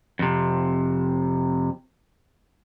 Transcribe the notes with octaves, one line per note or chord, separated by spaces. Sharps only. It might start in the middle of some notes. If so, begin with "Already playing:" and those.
F2 C3